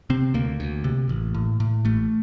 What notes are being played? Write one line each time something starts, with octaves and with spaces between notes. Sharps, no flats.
C3 C4
D2 A#3
D2
C3
A1
A2
A2
A1 A3